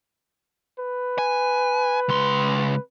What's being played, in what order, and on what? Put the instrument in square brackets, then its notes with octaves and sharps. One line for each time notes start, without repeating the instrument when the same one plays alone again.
[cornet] B4
[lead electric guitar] G#5
C#2 C6